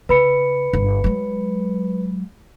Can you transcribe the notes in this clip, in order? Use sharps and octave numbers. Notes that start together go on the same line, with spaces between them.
C#3 B4 B5 C#7
G1
F#3 G#3